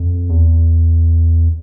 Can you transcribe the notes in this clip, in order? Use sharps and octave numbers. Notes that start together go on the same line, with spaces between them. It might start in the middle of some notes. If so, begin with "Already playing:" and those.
Already playing: F2
E2